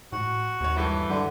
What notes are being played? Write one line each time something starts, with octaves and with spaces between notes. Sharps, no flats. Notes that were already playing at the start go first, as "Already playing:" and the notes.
A2 F#4
D#1 D#2 C#5
G2 E3 G4 A4
D3 G3